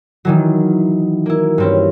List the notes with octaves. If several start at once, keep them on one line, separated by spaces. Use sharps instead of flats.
D#3 E3 F#3
A#3 E4
G2 C4 C#4